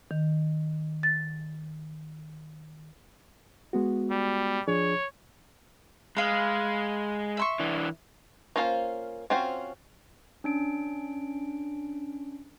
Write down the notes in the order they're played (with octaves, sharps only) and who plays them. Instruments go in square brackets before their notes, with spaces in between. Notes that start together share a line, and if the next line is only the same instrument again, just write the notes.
[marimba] D#3
A6
[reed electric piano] G#3 B3 F#4
[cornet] G3
[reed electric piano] F3 D4 G#4 [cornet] C#5
[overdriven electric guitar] G#3 [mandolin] B4 F5
[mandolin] E5 C6 C#6
[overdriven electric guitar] E3 D4
[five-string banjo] A#3 C#4 F4 A4 C5
C4 C#4 F4 F#4 C5
[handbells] C#4 D4 D7